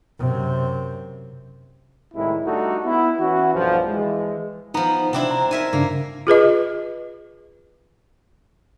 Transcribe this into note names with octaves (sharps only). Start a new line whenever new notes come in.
F#2 C3
C2 A2 D#3 G#3 E4
G3 A3 D4 D#4 F#4 A4
B3 E4
E3 C#4 E4 F#4
B1 G2 A#2 F3
E3 G#3
F3 B3 D#4 A#5
C3 C4 D4 E4
A#5
D#4 A#4 E5 G#5
G2 C#3 A#3 D4
F4 G#4 B4 D#5